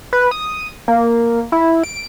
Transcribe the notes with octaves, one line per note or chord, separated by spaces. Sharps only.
B4
D#6
A#3
E4
D7